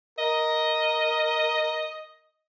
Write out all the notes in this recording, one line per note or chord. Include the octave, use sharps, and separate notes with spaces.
A#4 D#5